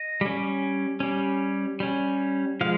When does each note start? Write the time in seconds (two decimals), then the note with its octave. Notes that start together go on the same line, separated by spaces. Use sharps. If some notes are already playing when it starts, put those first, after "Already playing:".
Already playing: D#5
0.21 G3 C#4
1.00 G3 C#4
1.80 G3 C#4
2.61 F3 G#3 F5